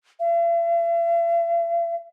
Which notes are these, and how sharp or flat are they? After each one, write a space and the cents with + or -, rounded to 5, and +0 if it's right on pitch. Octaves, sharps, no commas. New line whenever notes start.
E5 +45